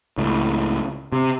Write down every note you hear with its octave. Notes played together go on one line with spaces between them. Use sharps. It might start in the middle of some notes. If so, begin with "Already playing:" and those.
C#2 A2
C3